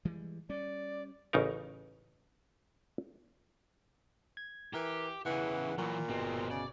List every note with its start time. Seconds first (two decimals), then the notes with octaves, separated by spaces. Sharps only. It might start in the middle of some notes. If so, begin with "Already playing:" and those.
0.05 E3 G3 G#3
0.49 G3 C#4 D5
1.33 A1 C#3 D#4 A#4
4.37 G#6
4.74 E3 G4 A#4
5.26 E2 C#3 E3 F#5
5.78 A#2 E3 F#3
6.09 G1 B2 G#3 C4
6.50 C#3 D5